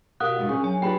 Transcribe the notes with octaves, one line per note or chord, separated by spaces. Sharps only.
B2 G4 A#4 F5 F#5 D#6 F#6
G2 G#3 F4
C#4 G#4 C#5 C#6
F#3 D4 G#5
D4 F4 G4 G#4 B4 G5 B5